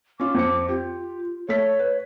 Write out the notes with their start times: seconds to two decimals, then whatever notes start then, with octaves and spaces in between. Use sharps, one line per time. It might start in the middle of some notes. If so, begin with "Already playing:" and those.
0.20 C#4 F4 D6
0.35 F2 C#7
0.68 F4 G4
1.49 A3 A4 C#5 B6
1.79 B4